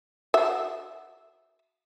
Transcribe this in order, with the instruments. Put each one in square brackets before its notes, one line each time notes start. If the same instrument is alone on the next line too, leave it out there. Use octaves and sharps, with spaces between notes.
[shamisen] F#4 E5